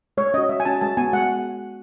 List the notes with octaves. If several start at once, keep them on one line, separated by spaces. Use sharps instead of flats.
G#3 C#5
C#4 F#4 D#5
G#3 E5
G#5
C#4 F#4 A5
G#3 A5
B3 F#4 G#5
G#3 F#5